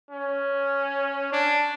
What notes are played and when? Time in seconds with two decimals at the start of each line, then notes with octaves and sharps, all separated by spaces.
0.11 C#4
1.32 D4